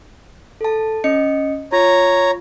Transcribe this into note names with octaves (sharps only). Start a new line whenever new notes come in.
A4 A5
C#4 D#5 C#7
F4 C#5 A#5